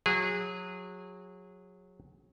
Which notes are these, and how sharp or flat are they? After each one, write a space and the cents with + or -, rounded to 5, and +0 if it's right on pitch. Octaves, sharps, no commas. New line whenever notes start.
F#3 -20 G#4 -25